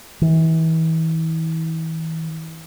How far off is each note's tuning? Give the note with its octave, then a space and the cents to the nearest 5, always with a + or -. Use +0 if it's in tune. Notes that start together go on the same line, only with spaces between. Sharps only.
E3 -35